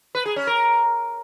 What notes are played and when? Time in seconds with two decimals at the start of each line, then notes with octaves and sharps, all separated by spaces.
0.15 B4
0.25 G#4
0.36 C#4
0.47 A#4